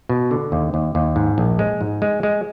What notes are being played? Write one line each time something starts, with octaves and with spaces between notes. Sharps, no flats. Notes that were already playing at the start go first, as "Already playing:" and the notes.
B2
D3
D#2
D#2
D#2
G#2
A#1
G#3
G#2
G#3
G#3